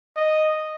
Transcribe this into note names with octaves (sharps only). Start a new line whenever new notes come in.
D#5